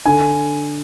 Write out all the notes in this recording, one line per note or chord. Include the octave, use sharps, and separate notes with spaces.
D3 G#5